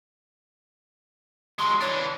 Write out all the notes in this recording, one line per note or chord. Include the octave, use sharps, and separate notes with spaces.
F#3 G#3 C6
E3 D4 C#5